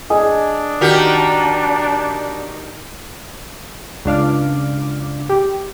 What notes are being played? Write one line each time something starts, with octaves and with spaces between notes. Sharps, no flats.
D4 G#4 D#5 G#5
D#3 F#4 G4
C#2 G#2 D4 F5 D6 F6
G4